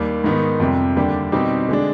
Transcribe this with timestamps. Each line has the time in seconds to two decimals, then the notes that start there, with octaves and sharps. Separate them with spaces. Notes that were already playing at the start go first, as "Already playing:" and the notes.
Already playing: D#2 D#3 G3
0.24 G#2 D#3 B3 D#4
0.60 F2 C3 G3
0.96 D#2 D3 G3 D4 G4
1.32 B2 G3 C4 D#4 G4
1.69 D3 G#3 D4